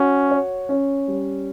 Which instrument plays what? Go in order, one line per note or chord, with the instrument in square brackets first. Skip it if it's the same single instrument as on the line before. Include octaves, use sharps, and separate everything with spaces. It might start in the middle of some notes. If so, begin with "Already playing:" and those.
Already playing: [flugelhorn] C#4 [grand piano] F#4
[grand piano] C#5
C#4
G3